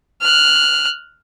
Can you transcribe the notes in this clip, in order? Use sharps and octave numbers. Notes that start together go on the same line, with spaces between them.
F6 F#6